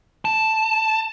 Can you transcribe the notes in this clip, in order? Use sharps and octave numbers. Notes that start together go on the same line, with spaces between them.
A5